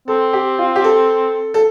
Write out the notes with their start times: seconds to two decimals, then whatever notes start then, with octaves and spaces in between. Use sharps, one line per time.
0.08 C4 A4
0.33 G4
0.59 F4
0.76 G4
0.84 A4
1.54 A4